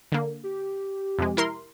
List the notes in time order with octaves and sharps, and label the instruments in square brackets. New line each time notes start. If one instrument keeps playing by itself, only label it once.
[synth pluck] D3 A#3
[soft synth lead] G4
[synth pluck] F2 C3 G#3
E4 A#4 C6